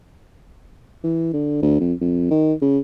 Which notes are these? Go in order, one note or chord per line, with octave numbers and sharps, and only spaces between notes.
E3
D3
D2
F2
F2
D#3
C#3